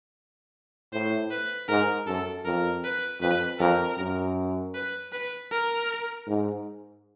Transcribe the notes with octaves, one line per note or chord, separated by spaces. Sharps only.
A2 C5
B4
G#2 A#4
F#2 A4
F2 A#4
B4
F2 B4
F2 A#4
F#2
B4
B4
A#4
G#2